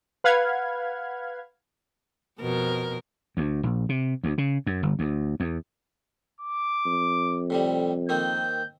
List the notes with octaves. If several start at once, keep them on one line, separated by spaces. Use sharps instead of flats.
B4 F5 F#5 B5 F6 G#6
F2 B2 A#4
D2
A#1
C3
D2
C#3
F#2
G1
D2
E2
D6
F2
A2 C3 G3
D#3 A#3 C4 G6